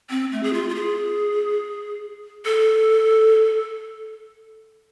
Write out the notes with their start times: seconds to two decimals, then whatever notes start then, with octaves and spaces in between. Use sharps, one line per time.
0.10 C4
0.32 A3
0.43 G#4
0.54 F4
0.69 F4
0.75 G#4
2.45 A4